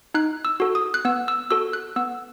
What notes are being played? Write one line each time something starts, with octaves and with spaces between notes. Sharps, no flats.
D#4 F#6
E6
F#4 A4
D#6
F#6
B3 E6
E6
F#4 A4 E6
F#6
B3 E6